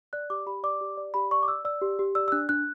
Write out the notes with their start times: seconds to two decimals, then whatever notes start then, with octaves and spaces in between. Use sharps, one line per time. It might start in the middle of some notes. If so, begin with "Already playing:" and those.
0.13 D5 F#6
0.30 G4 D6
0.46 G4 B5
0.64 D5 D6
0.81 G4
0.97 D5
1.14 G4 B5
1.31 D5 C#6
1.43 D6
1.48 D5 E6
1.65 D5 E6
1.81 G4
1.99 G4
2.15 D5 E6
2.28 E6
2.32 D4 F#6
2.49 D4 F#6